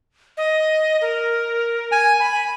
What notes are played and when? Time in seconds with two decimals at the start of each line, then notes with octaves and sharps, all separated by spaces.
0.37 D#5
1.02 A#4
1.92 G#5
2.20 G#5 B5